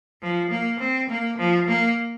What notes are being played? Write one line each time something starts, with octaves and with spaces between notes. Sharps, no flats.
F3
A#3
C4
A#3
F3
A#3